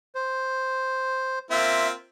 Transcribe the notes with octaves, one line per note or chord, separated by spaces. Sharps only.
C5
A#3 C4 F4 E5